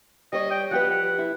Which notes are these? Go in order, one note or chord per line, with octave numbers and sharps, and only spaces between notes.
G3 C#5 D#5
G5
F3 G4 B4 F#5
F#5
E4